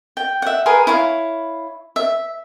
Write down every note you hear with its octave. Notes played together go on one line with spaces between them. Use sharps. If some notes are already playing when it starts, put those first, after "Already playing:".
G5
E5 F#5
G#4 A#4 B4 C6
E4 C#5 F5
E5